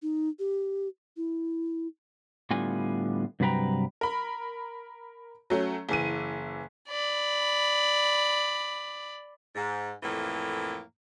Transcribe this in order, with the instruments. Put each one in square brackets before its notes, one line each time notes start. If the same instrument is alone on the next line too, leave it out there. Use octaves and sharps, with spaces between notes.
[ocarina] D#4
G4
E4
[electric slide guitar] A2 D3 G3 B3 F4 G#5
G2 C3 F#3 B4 G5 A#5
[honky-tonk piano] A#4 B5
F#3 A3 C#4
F#1 E3 D#7
[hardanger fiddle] D5 B5
[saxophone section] G#2
F2 A2 E3 A#3